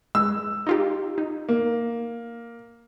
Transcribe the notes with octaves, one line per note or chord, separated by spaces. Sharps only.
G#3 E6
D#4 F4 G4
D#4
A#3